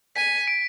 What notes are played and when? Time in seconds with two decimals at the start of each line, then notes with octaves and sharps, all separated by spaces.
0.16 G#5 B6
0.48 D7